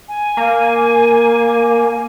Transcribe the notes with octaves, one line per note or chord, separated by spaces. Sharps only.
G#5
A#3